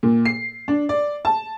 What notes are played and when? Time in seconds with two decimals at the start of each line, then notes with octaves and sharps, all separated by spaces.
0.03 A#2
0.25 C7
0.68 D4
0.89 D5
1.25 A5